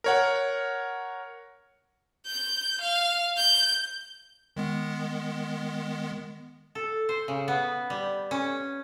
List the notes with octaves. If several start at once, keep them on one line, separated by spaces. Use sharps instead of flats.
A#4 C#5 F#5
G6
F5
G6
D#3 G#3 B3
A4
C5
C#3
B3
G3
C#4